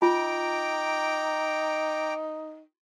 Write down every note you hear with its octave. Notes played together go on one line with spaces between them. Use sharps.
D#4 F4 G5 A#5 D6